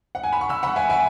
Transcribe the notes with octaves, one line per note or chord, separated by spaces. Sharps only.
F#5
G#5
B5
C#6
B5 E6
F#5 B5
E5 G#5
E5 G#5